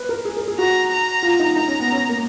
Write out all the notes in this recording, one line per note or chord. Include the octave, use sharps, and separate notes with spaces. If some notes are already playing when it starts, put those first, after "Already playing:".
Already playing: B4
A#4
G#4
A#4
G#4
F#4 A#5
A#5
F4
D#4
D#4 A#5
C#4
B3
C#4
A#3